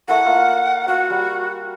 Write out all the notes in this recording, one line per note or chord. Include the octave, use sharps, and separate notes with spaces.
A3 E4 A#4 F#5
A#3 F4
F#4 F5 F#5
G3